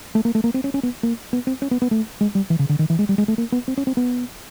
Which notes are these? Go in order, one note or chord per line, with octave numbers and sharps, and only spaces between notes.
A3
A#3
A3
A#3
C4
C#4
C#4
B3
A#3
B3
C4
C#4
B3
B3
A3
G#3
G3
E3
C#3
D3
D#3
E3
G#3
G3
G#3
A3
A#3
B3
C4
C#4
C4
B3